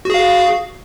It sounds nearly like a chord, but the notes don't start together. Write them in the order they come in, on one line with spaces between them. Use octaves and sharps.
F#4 G#4 F5